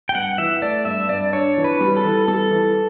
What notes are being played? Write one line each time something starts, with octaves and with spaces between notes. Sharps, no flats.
G5
G2 F#5
E3 E5
A3 D5
G2 E5
G2 D5
D4 C#5
E3
B4
G3
A4
E3
G3 A4
E3